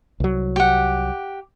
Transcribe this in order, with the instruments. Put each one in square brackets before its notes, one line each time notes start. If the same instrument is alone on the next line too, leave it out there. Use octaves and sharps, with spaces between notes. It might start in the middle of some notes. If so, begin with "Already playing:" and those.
[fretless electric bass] C2 F#3
[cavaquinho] G4 F#5